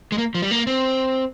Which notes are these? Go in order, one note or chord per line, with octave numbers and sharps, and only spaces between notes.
G#3
A#3
F3
G3
A#3
C4